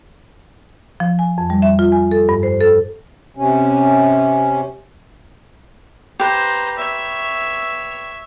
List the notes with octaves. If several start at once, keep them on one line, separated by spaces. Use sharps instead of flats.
F3
G#5
F2
G3
E5
F4
G#5
A4
G2
C5
A4
C3 C#4
G4 B4 C5 A#5
C#5 E5